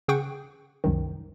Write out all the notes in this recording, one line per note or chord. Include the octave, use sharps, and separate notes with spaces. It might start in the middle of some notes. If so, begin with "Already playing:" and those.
C#3 G#4 F#5 G5 C#6 D7
C2 F#2 D#3